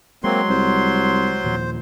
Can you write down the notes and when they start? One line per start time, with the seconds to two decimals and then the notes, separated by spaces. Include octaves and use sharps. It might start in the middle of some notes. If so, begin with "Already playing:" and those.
0.24 F#3 G#3 A#3 C4 C6
0.49 C2 C5
1.44 D#2 A#2 F3